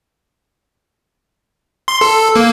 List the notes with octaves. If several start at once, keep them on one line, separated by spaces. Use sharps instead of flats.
C6
A4
A#3